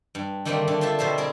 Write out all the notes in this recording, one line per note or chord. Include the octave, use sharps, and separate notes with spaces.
G2
D3 D#3 G3 A3 A#3 C4
D3 D4
F4 C5 E5 A5
B2 G4 C5 E5 A5 C6
C4 E4 G#4 A#4